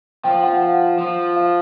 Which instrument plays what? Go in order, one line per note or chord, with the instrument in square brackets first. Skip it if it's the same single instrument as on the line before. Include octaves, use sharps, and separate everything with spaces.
[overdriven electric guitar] F3 [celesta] G5
[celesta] F#5
F5
F#5
[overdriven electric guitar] F3
[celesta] F5